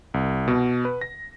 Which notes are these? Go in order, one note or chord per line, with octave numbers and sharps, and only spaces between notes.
C2
B2
B4
A#6